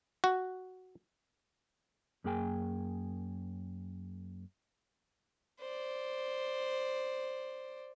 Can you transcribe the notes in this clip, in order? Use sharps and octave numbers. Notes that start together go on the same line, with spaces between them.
F#4
F#2 A#3 G#4 G5 G#5
C5 D5